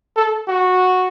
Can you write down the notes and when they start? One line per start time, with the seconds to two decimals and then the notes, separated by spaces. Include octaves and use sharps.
0.16 A4
0.48 F#4